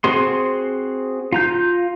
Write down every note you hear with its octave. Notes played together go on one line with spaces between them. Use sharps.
C4 F#4 G#4 C6
F4 A#5 G6